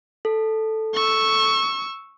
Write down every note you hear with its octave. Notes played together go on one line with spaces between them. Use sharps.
A4
C#6 E6